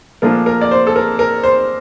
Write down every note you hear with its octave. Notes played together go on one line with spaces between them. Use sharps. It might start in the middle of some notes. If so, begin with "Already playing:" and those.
A#2 F3 A3 D4 A#4
A#4
D5
C5
A4
A#4
A#4
C5